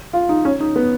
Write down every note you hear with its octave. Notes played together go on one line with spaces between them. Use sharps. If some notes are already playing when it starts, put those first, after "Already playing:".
F4
D#4
C#4
D#4
B3